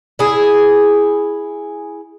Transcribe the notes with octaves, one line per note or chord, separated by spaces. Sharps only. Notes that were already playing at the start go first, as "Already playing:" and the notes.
E4 G#4